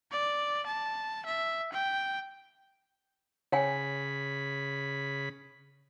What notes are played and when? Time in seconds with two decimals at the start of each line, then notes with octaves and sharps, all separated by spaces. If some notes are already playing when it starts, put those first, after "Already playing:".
0.12 D5
0.66 A5
1.26 E5
1.73 G5
3.52 C#3 C#5 G5 G#5 B5